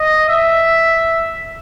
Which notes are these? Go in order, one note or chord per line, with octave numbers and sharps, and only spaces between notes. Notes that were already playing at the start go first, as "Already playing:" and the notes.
Already playing: D#5
E5